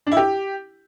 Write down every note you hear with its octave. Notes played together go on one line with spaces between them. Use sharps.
D4
E4
G4